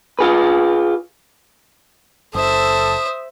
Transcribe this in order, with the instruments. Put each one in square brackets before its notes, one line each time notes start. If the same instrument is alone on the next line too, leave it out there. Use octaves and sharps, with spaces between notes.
[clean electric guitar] F4 G#4 B4
[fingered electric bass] F#1 [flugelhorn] A4 [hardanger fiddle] C5 E5 [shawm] D#6